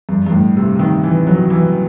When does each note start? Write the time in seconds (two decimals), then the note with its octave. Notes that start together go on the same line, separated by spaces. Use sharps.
0.09 G2
0.26 G2
0.32 A2
0.57 C3
0.75 C3
0.79 D#3
1.04 E3
1.27 F#3
1.50 E3